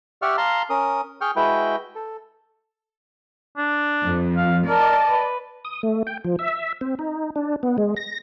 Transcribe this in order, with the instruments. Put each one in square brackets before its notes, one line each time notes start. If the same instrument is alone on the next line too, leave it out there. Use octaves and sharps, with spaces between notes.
[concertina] G4 D5 E5 F#5 C#6 F6
F5 A5 A#5 C6
C#4 A#4 D#6
G#4 G5 C#6 F6
G#3 E4 F#4 B4 G5
A4
[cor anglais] D4
[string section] F2
[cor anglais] F5
[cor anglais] A#4 [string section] D5 D#5 [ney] A5
[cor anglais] B4
[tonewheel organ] D#6
A3
G5
F3
E5
C4
D#4
D4
B3
G#3
A#6